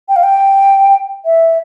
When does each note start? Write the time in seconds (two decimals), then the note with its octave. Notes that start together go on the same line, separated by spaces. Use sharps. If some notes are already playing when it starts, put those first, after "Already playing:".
0.09 G5
0.16 F5
0.23 G5
1.25 E5